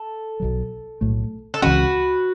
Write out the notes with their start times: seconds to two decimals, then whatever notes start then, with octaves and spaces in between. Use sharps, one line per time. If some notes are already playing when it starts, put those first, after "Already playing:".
Already playing: A4
0.40 B1 B2 F#3
1.01 B1 A2 A3
1.54 A4
1.62 C#2 C#3 E3 C#4 F#4 B4